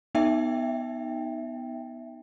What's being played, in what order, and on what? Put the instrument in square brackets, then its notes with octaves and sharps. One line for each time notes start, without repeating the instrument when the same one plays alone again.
[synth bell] B3 D#4 D#5 E5 G5